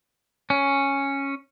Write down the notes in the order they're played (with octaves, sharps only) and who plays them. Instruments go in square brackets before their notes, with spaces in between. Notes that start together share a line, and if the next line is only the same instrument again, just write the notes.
[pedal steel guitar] C#4